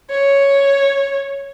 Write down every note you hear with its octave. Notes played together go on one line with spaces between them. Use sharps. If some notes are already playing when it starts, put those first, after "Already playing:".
C#5